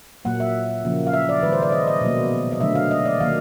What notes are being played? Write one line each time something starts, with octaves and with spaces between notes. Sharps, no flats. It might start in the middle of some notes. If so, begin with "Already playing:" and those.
A#2 F#3 A#3 F#5
E5
C#3 F3 A#3
F5
E5
D5
D#3 G#3 B4
C5
D5
D#5
D#5
B2 F#3 A#3
D#5
D3 F#3 A3 E5
F5
D#5
D5
D#3 F#3 A#3 F5